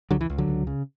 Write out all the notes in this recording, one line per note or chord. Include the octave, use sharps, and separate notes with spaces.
C#2 D3 F#3
E3
C#2
D3 F#3
C#2
C#3